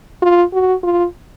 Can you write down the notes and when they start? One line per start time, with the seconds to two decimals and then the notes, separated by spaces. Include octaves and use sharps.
0.22 F4
0.53 F#4
0.83 F4